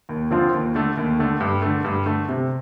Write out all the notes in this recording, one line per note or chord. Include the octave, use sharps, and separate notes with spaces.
D#2
D3 F3 C4 F4
D#2
D3 A3
D#2
D3 A3
G2
D3 A3
G2
D3 A3
C3